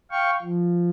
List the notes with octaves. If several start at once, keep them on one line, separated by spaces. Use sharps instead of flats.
F5 G5 C#6
F3